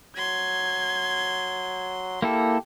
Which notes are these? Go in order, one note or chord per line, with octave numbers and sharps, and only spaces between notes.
F#3 C6 G#6
A#3 E4 G4 A4